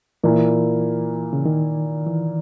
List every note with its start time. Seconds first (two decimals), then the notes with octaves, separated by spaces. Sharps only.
0.23 A#2 E3 A#3 E4
1.33 C#3
1.46 D#3
2.06 E3